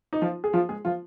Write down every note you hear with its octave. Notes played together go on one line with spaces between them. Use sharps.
D#4
F3 F4
G#4
F3 F4
G#3 G#4
F3 F4